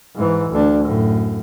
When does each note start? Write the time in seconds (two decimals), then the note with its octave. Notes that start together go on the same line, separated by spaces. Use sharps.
0.15 G#2 E3
0.50 D2 D4
0.85 F#2 A2